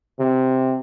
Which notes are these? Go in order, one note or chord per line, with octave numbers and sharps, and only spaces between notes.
C3